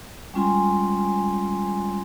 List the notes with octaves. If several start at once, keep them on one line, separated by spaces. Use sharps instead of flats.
G3 G#3 C#4 F4 G#5 C6